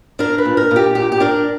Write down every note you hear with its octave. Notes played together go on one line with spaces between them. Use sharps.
D4 A#4
B4
A#2
A#4
A#2
G4
A#2 G4
G4
D4 A#4